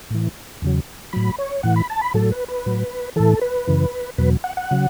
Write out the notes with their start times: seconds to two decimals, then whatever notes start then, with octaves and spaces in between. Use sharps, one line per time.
0.10 A2 E3
0.62 E2 C#3 F#3
1.13 A2 F#3 B5
1.38 C#5
1.63 A2 E3 F#5
1.76 B5
1.90 A5
2.01 B5
2.14 A2 F#3 A4
2.32 B4
2.48 B4
2.66 A2 F#3
3.16 A2 E3 A4
3.41 B4
3.67 F#2 C#3 E3
4.18 E2 B2 F#3 B4
4.44 F#5
4.57 F#5
4.71 C#3 F#3